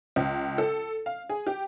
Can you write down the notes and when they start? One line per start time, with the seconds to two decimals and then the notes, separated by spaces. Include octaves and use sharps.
0.16 C#2
0.58 A4
1.06 F5
1.29 G#4
1.47 G4